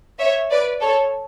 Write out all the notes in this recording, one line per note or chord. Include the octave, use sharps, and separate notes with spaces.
C#5 E5
B4 D5
A4 C#5